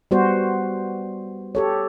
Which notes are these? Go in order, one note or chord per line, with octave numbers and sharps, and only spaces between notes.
G3 B3 F#4 C5
G4 A4 C#5